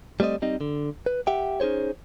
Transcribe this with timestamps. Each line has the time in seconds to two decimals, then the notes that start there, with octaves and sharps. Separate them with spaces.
0.20 G3 A3 C4 D5 D#5
0.42 G3 C4 D#4 D#5
0.61 D3
1.06 B4
1.27 G4 E5 F#5 G5
1.60 C#4 D#4 G#4 C5 C#5